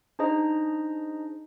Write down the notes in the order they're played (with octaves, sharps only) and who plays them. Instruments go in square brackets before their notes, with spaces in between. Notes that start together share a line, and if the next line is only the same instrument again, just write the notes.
[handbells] D4 D#4 G#4 C5 D#5 A#5